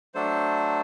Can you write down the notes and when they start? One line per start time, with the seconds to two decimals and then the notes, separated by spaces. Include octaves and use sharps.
0.14 F#3 A3 D4 A4 C5